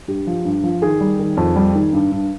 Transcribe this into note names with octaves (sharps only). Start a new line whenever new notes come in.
G2 G4
F3
G2
F3
D#3 G#4
G3
D#3
F2
G3
D#3
G2
G2